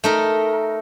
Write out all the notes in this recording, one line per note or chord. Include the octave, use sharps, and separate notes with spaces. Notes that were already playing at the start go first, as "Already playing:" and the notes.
A3 D#4 A#4